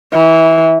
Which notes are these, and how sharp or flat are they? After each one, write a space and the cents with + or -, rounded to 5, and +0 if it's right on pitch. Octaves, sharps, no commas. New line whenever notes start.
E3 -20